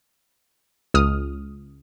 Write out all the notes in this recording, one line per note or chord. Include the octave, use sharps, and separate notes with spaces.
C#2 D#6 F6